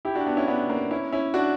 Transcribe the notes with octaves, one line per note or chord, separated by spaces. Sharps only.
E4 G4
D4 F#4
B3 D4
C#4 E4
B3 D4
A#3 C#4
C#4 E4
C#4 E4
D4 F#4